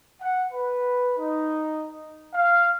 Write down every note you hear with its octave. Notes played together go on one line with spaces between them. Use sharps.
F#5
B4
D#4
F5